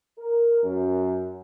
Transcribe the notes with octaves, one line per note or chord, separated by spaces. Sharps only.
A#4
F#2